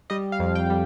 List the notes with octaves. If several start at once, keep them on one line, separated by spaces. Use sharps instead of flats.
G3 D#5
F5
F2
G5
G3